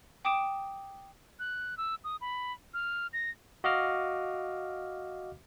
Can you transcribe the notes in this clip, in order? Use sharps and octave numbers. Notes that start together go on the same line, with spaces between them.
G5 D6 D#6 D7 E7
F#6
E6
D#6
B5
F6
A#6
F#4 D#5 F5 D6 F6